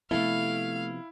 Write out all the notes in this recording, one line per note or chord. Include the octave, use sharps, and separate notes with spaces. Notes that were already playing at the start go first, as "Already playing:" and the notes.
C3 F3 A3 B3 E4 A4 F5